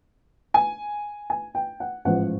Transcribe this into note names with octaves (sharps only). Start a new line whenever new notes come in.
G#5
G#5
G5
F#5
A1 G#2 F3 F#5